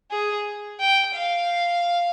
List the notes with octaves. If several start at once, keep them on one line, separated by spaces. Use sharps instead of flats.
G#4
G5
F5